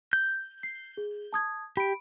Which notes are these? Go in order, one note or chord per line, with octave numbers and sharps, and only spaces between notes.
G6
C7
G#4
A5 D#6 G#6
G4 B5 D7